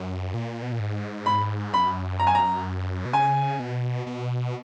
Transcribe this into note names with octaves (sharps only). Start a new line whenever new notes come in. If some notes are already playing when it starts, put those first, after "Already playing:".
Already playing: F#2
A#2
B2
A#2
G#2
B5
F#2 B5
A#5
G#5
A#5
B2
C#3 G#5
B2
B2